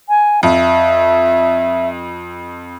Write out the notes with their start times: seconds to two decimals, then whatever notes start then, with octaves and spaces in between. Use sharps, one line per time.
0.09 G#5
0.43 F2 E5